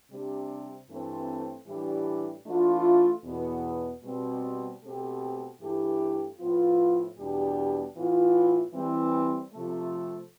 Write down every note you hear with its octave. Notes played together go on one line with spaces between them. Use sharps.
C3 G3 D4 G4
G2 E3 A3 C4
A2 E3 G3 D4 G4
E3 A3 D4 F4
E2 B2 B3
B2 G3 C4
B2 A3 C4 G4
G2 E3 A3 E4 G4
A2 F3 B3 F4
E2 B2 G3 D4 G4
A2 E3 B3 F4
E3 G3 C4
C3 F3 A3